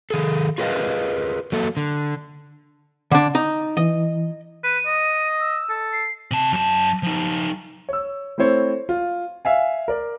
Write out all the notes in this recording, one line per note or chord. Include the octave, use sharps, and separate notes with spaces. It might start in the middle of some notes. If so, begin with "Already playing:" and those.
D#3 G#4 A4
F4 G#4 A#4 B4 D#5 F5
F#3 A#3 A4
D3
D3 D4
D#4
E3 D#5
B4 D#7
D#5
E6
A4
C7
C3 A5
F#2 A5
F3 D#4
C#5 E6
A3 C4 E4 C5 C#5
F4
E5 F5 G#5
A#4 D5